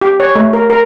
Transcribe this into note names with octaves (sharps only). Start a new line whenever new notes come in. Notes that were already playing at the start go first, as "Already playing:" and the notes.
G4
C#5
A3
A#4
A#4